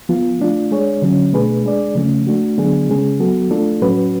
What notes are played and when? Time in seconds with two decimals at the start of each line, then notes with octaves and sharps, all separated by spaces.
0.09 F3 B3 F4
0.39 A3 D4 F4
0.71 G#3 D4 G#4 C#5
1.02 D3 F#3 C#4
1.33 B2 A3 D4 G#4 B4
1.65 G#3 D4 G#4 D5
1.95 C#3 F3 A3 C#4
2.27 A3 D4 F#4
2.58 D3 F#3 B3 D4 G#4
2.89 C#3 G#3 C#4 G#4
3.20 F#3 B3 F#4 A4
3.50 F3 A3 D4 F4 A4
3.82 A2 F#3 C#4 F#4 B4